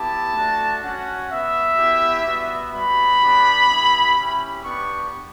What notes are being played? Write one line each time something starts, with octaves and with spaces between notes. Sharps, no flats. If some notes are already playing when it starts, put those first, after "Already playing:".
Already playing: B3 E4 G4 A5
A3 D4 F#4
C#4 F#4 F#5
B3 F#4 E5
B3 E4 G4
G3 B3 F#4
G3 B3 F#4 B5
B3 D4 G4
B3 E4 G4
C#4 E4 G4
B3 D4 G4 C#6